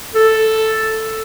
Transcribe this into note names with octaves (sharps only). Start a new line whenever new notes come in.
A4